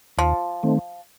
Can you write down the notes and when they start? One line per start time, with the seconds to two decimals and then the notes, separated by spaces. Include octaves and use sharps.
0.18 D#2 F3
0.63 D#3 A3 C4